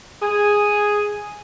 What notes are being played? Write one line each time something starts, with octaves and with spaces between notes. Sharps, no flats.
G#4